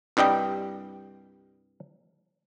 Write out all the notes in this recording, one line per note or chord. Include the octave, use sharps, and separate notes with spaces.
C2 G2 G3 D#5 G5